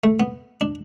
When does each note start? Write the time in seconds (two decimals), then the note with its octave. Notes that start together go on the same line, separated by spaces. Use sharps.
0.04 A3
0.20 B3
0.61 D4